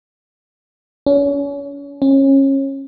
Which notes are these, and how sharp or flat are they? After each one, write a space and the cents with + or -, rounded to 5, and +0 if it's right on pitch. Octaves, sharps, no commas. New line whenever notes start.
C#4 +35
C#4 -25